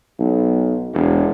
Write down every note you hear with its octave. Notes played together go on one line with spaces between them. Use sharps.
B1
E1